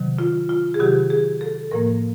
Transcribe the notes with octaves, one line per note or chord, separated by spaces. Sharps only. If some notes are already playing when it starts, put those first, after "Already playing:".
Already playing: C3 D#3 F#3
F4
F4
G#4
C3 D#3 F#3 G4
G#4
A4
A2 F3 A#3 A#4